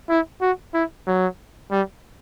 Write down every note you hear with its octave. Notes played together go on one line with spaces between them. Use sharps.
E4
F#4
E4
F#3
G3